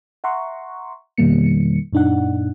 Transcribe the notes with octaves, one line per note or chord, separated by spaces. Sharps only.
E5 F#5 A#5 C6 C#6
F2 B2 D#3 G3 A#3 C#7
F#2 A#2 D4 D#4 F#5